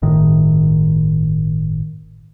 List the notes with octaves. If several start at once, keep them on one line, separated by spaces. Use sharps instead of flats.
G1 A2 D#3